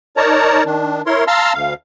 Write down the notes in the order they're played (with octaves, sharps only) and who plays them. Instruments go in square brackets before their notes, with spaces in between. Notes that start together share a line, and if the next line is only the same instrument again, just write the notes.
[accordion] D#4 A#4 C#5 D5 A5 A#5
D#3 D4
E4 A#4 C#5 C6
F5 A5 A#5 C6 E6 F6
D2 F5